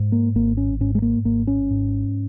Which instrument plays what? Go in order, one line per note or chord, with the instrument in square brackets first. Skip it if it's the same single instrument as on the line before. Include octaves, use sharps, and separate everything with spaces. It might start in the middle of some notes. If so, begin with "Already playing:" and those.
Already playing: [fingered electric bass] G#2
A#3
G#1 A#3
C#4
G#2 C#4
G#3
A#3
G#1 A#3
C#4
G#2